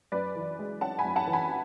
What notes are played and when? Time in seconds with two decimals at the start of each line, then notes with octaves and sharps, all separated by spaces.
0.12 F#2 B4 D5
0.36 E3
0.59 G#3
0.81 C#4 F#5 A5
0.99 G#5 B5
1.05 F#2
1.16 F#5 A5
1.27 E3
1.33 G#5 B5